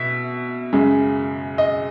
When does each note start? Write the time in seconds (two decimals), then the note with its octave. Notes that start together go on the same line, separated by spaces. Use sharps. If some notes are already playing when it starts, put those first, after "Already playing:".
Already playing: B2 E5
0.73 F#2 C#3 G#3
1.58 D#5